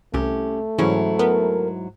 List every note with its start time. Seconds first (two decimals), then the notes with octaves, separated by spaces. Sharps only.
0.14 C2 A3 C#4 G4
0.78 G#2 C#3 E3 F#3 C#4 E4
1.19 B3 A#4